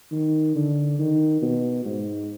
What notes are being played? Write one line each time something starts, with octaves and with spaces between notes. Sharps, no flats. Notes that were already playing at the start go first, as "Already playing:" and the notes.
D#3
D3
D#3
B2
G#2